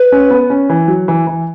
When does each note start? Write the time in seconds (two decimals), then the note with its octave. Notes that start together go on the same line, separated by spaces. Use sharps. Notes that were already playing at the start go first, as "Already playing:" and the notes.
Already playing: B4
0.12 C#4
0.31 B3
0.50 C#4
0.69 E3
0.88 F#3
1.08 E3
1.27 E3